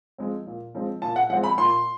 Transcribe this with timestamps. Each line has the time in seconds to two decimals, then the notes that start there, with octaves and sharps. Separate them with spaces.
0.18 F3 G#3 C4
0.46 A#2
0.75 F3 G#3 C4
1.02 A#2 A5
1.16 F#5
1.30 F3 G#3 C4 F#5
1.43 B5
1.58 A#2 C6